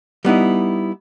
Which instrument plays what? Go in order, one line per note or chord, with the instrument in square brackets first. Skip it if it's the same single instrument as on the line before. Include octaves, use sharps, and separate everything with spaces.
[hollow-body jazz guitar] G3 B3 D#4 E4